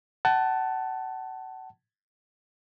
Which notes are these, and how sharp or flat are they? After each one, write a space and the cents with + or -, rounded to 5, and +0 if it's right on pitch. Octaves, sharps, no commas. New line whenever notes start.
F#5 +30 A5 +0